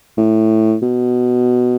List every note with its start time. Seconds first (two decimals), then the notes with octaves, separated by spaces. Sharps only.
0.17 A2
0.82 B2